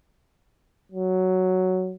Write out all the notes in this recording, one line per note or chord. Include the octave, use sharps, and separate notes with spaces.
F#3